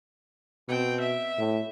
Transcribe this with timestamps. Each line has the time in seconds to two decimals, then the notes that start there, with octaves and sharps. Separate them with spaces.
0.69 B2 C4 G5
1.01 E5
1.38 A2